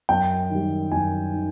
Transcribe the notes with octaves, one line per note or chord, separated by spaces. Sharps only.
F#2 G5
D#3 G3
F#2 G#5
D#3